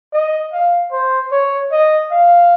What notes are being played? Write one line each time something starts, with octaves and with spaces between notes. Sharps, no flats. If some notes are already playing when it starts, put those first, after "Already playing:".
D#5
F5
C5
C#5
D#5
F5